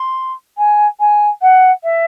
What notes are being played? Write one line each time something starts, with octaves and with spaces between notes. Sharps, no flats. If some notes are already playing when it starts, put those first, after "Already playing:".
Already playing: C6
G#5
G#5
F#5
E5